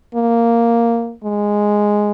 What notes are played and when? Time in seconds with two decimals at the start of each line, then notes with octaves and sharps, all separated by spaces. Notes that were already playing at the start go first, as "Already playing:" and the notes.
0.15 A#3
1.24 G#3